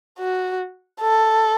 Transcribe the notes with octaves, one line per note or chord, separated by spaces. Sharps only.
F#4
A4